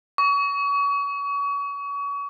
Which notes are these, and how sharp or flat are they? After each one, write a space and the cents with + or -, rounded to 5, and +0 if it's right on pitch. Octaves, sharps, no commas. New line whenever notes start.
C#6 +35